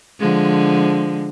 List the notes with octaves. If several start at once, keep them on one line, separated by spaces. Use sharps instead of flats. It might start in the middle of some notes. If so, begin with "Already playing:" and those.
D3 F3 G#3